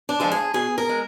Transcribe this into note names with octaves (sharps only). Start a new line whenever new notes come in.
D4
F3 G#3 A4
G#4
B2 G#4
A#4
G#3